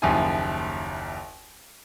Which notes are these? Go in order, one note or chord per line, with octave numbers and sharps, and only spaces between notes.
F#1 D#2 F3 E4 G#5